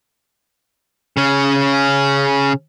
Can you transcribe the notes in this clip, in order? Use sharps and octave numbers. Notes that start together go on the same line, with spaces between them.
C#3 C#4